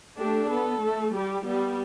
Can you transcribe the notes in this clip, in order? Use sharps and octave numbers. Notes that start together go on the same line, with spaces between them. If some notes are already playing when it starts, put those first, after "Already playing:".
A3 D4 G4
B3 A4
A3
G3 G4
G3 B3